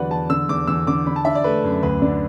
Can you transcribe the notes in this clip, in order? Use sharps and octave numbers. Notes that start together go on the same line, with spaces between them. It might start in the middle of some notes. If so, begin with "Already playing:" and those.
Already playing: E2 D3 F#3 B4 D5 F#5
E2 A5
D3 E6
E2 D6
E2 E6
D3 D6
D3 B5
A5
D4 E5
D5
A3 B4
F#2
D2 B4
D3 D5